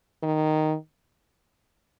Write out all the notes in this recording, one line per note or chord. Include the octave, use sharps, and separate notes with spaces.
D#3